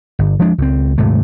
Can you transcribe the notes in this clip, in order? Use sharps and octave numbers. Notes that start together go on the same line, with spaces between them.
G1
F3 G#3 D4
C#2 C4
D#1 G#2 C3 A3